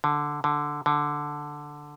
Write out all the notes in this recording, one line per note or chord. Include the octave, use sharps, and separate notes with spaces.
D3
D3
D3